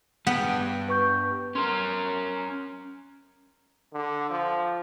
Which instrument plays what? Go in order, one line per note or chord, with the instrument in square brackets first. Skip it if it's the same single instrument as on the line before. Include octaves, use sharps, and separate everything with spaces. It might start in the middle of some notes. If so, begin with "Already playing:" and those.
[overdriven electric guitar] G2 G5 [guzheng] B3
[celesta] B4 C#6 G6
[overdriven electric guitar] C#4 A#4 [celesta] C6
[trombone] D3
F3